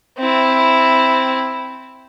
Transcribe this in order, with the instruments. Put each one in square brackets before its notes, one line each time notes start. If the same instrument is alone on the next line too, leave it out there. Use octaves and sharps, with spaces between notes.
[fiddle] C4 E4